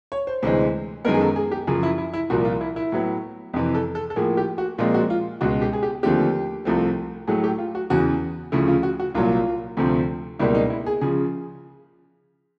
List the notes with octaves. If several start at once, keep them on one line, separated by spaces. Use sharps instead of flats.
C#5
C5
D2 C3 E3 G#3 C5
F#2 D#3 G#3 B3 A#4
G#4
A4
G#4
G4
F#2 C#3 F3 G#4
E4
E4
E4
C2 A#2 F3 A#3 F#4
F4
E4
E4
A2 F#3 B3
F2 C3 E3
A4
A4
A4
A2 F3 A#3 G#4
G4
F#4
A#2 F3 G#3 C4 F4
F#4
F4
C#2 B2 G#3 F#4
G4
G#4
G4
D#2 D3 F3 A3 C4 G4
C2 C3 F3 A3 C4
A2 F#3 A3 G#4
G4
F4
F#4
E2 C#3 E3 F#4
D2 C#3 F3 A3 E4
F4
F#4
F#4
C2 A#2 F#3 F4
D2 C3 F3 A3 C4
C#2 B2 G3 A#3 E4
D#4
E4
G#4
C#3 F3 G#4